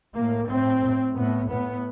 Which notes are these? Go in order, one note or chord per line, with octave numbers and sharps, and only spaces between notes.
A2 A#3
A2 C4
A2
A2 B3
A2 B3